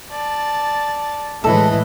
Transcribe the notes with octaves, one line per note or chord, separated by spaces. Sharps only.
D5 A5
A2 E3 G#3 E4 A4 D#5